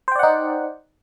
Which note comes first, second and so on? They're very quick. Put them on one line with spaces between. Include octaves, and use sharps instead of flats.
C5 G5 D5 F#5 D#4